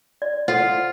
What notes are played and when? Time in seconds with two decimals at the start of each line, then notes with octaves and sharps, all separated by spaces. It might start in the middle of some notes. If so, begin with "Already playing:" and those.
0.22 D5
0.48 F4 A4 C5 F#5